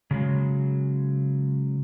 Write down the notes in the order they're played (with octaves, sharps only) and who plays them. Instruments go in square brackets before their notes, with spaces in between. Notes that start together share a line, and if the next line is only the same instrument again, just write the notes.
[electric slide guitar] C#3 F#3 G#3